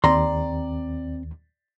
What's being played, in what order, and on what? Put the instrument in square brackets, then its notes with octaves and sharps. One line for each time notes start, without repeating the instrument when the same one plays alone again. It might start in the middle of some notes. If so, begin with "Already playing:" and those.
[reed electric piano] D#2 [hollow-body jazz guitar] C4 A#5 C6 [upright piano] D5